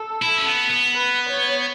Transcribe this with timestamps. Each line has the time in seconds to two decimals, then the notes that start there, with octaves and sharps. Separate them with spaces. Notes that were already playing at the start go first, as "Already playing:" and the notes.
Already playing: A4
0.22 E4
0.38 C#4
0.46 B3
0.70 B3
0.94 B4
1.29 C#5